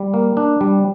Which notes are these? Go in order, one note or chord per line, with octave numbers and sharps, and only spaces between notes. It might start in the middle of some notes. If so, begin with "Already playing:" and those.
Already playing: G3
A#3
D4
G3